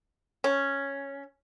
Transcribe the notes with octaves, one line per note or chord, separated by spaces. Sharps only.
C#4